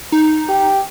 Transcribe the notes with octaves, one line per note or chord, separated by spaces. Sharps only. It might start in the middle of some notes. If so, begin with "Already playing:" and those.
D#4
G4